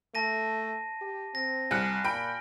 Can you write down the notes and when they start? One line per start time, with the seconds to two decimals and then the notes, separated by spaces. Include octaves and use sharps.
0.15 A3 A5 A#6 D#7
1.01 G4
1.35 C4 A#6
1.71 C2 G#5 F6 F#6 C#7
2.04 A#2 G5 B5 D7